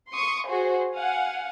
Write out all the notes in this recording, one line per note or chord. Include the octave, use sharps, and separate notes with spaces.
C6 C#6 D#6
F#4 G#4 C5
F5 F#5 G#5